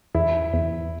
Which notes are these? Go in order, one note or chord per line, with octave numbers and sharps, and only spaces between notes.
E2 E4
E2